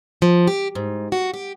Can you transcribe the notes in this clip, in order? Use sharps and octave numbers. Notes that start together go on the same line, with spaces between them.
F3
G4
G#2
F#4
G4